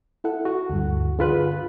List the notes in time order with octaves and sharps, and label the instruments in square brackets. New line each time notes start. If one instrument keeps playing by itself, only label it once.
[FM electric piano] E4 A4 F#5
[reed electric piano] F#4
[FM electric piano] D2 G2
[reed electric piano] D3 F4 B4 [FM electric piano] G#4 B5 F#6